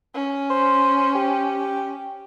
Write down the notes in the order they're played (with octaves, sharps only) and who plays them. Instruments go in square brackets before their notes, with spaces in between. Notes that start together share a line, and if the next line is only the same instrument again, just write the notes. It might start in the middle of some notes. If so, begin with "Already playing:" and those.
[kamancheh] C#4
[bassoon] C5
G4